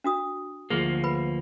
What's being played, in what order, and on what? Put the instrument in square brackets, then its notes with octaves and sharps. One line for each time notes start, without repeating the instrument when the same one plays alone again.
[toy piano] D4 F#4 D#6
[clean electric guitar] D2 F3 A#3 [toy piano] G#4
[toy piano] B4 B5